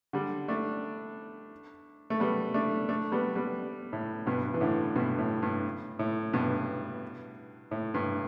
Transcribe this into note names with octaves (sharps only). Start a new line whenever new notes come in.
D3 G3
A3 D4
A3
G3 B3
A3 D4
A3 D4
G3 B3
G3 B3
A2
G2 B2
E3
A2 D3
G2 B2
A2
G2
A2
G2 B2
A2
G2